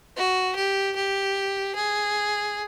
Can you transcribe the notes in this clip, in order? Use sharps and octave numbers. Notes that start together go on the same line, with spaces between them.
F#4
G4
G4
G#4